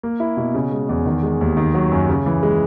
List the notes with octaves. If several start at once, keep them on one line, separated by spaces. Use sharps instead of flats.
A#3
E4
B2
C#3
G#3
E2
D#3
G#3
D#2
D#3
F#3
F#2
C#3
E3
G#3